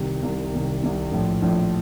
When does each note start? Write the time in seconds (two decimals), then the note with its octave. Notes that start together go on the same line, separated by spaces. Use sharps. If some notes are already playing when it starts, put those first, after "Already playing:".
Already playing: C2 C3 D#3
0.23 C2 C3 D#3
0.53 C2 C3 D#3
0.82 C2 C3 D#3
1.12 A#1 A2 F3
1.42 A#1 A2 F3